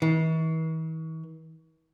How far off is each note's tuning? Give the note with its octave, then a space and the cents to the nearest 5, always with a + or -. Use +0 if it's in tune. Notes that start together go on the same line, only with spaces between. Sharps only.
E3 -45